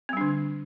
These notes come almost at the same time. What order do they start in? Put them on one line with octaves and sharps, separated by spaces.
C4 G3 D4 D3